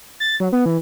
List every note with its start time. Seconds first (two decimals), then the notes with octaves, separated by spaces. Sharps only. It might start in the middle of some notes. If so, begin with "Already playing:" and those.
0.20 A6
0.40 F#3
0.52 B3
0.66 E3